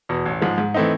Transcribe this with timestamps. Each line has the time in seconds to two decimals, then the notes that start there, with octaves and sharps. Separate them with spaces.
0.09 E2 B2
0.26 A1
0.42 G#2 F3 G#3
0.58 G#2
0.74 E3 A3 C4 D#4